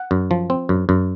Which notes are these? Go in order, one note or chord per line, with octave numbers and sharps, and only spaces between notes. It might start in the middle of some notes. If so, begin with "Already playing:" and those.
Already playing: F#5
F#2
F3
C4
F#2
F#2